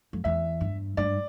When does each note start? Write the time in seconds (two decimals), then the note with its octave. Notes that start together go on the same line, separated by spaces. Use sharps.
0.13 F2
0.24 E2 E5
0.61 G2
0.97 G2 D5